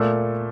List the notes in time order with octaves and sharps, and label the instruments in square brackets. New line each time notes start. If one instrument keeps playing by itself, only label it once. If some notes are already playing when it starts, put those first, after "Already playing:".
Already playing: [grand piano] A#2 A3